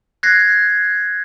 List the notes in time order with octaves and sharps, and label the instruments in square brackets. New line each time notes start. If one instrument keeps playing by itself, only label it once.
[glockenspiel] F#6 G#6 A#6 C7